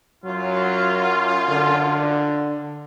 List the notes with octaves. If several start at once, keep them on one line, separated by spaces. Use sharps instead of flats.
F#2 F#3 F4
D3